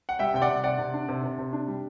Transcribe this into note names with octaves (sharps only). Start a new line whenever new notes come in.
F#5
G3 E5 G5
C3 G5
D5 F#5
C3
C3 D5 F#5
C3
D4
C3
C3
C3
D4
G3